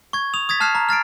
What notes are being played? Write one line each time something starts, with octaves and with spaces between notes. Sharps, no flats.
C#6 G#6
D#6 F7
D#6 G#6 A6 B6
A5 F6 F#6 C7 E7
A#5
F6 A6 C7 D7